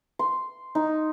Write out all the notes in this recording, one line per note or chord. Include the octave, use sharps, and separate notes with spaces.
C6
D#4